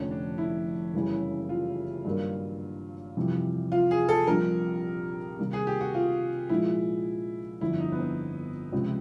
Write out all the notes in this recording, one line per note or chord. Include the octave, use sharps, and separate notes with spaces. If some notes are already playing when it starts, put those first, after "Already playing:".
Already playing: F1 F2 D3 C#4
D4
E4
F#1 F#2 C#3 E3 G3
F4
G2 D#3 F#3 A#3
F2 C3 E3 G3
F4
G#4
A4
A#1 A#2 G3 C4 D#4 A#4
C3 D#3 G3 A#3
G#4
G4
F#4
F4
A#1 A#2 F3 G#3 E4
G1 F2 D3 E4
D#4
B3
C4
C#2 C3 F3